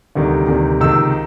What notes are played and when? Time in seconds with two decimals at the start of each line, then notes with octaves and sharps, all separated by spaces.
0.15 D2 C3 D#3 G3
0.48 D2 C3 D#3 G3
0.81 C#2 C3 D#3 E6